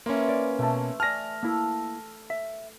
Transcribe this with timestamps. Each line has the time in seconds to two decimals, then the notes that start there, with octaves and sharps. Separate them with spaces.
0.06 E3 A#3 C#4 C6
0.29 D5
0.59 B2 A3 A5
1.00 D5 G#5 A5 F6 A#6
1.43 A#3 E4 A4
2.30 E5